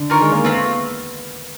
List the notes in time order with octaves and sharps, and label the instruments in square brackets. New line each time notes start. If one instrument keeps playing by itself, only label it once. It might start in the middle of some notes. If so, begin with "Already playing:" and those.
Already playing: [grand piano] D3
[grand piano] D#3 [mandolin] F4 A#4 C#5
[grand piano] G#3
A#3
[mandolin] A3 C4 F4 [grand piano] B3
[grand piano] B3